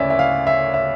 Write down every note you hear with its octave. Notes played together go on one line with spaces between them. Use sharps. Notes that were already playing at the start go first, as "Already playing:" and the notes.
Already playing: D2 C#3 C#4 C#5 D5 E5
E5
F5
E5
E5